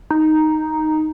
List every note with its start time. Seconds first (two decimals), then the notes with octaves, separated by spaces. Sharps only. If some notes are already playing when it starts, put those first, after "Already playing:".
0.11 D#4